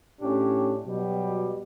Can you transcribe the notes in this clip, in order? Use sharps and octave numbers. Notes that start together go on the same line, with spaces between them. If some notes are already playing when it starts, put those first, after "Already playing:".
A2 C#4 D4 G4
B2 F#3 G3 G4